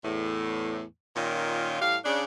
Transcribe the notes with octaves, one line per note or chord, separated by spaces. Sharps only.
E2 A2
A#2 D#3 C#4 F4
A2 G3 F5
C#3 D4